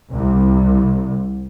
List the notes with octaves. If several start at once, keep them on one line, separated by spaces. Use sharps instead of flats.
C2